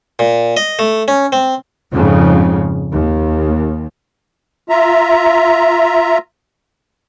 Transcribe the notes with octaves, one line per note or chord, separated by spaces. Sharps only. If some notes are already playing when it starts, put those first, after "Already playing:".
A#2
D#5
A3
C#4
C4
F2 G#2 C#3
D#2
F4 E5 A#5